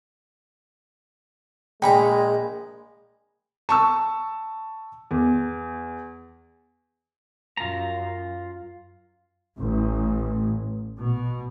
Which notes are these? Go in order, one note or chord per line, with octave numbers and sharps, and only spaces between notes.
A#1 G#3 G5 G#5 A#5 B5
A5 C#6 E6
E2
F#2 F4 A#5
A1
B2